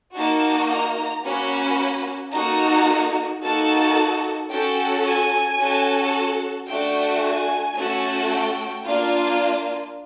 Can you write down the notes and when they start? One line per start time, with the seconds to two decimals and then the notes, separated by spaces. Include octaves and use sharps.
0.14 A#3 D#4 F#4 A5
0.69 A#5
1.24 A#3 C#4 F#4 B5
2.33 A#3 D#4 F#4 A4 A#5
3.42 A#3 D#4 F#4 A4 A5
4.50 C#4 F#4 A4 G5
5.05 G#5
5.59 C#4 F#4 A4
6.67 A3 D4 F#4 G5
7.23 G#5
7.77 A3 C#4 F#4 A4
8.31 G5
8.86 A#3 D4 F4 F5